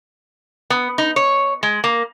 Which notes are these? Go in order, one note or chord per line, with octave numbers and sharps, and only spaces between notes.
B3
D#4
C#5
G#3
A#3